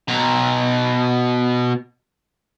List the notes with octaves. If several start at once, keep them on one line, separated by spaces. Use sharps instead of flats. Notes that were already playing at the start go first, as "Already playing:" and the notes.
B2 A#5